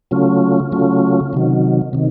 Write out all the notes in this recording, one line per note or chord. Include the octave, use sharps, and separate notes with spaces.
C#3 F#3 A3 C#4 F4
C#3 F#3 A3 C#4 F4
C3 D#3 F#3
C3 D#3